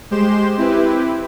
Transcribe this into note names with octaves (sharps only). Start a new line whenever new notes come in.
G#3 G4 C5 C6 E7
C4 E4 G4 B4